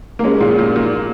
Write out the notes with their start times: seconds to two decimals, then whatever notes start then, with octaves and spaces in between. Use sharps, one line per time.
0.19 A#3
0.24 G#3 C#4
0.40 A#2 D#3
0.59 A#2
0.76 A#2